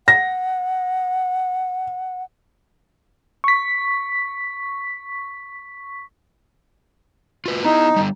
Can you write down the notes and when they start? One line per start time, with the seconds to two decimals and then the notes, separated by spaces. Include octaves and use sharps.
0.08 F#5 A#6
3.44 C#6 B6
7.46 F4 F#4 B4
7.64 B3 D#4 E4
7.96 D3 G3